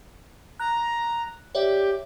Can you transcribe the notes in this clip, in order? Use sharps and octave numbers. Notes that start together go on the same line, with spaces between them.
A#5 F#6
G4 C#5 D5 E5